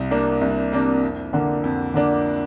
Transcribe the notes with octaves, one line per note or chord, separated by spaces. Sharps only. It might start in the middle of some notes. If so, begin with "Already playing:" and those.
Already playing: C2
C3 A#3 D4
C2
C3 A#3 D4
F2
D3 A#3 D4
F2
D3 A#3 D4